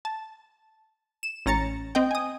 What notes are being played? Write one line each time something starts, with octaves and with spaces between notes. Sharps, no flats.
A5
E7
A1 C#4 A#5 A6 C#7
C4 D#5 G5
G#5 D#6